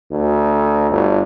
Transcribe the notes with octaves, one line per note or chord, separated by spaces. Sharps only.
D2
G1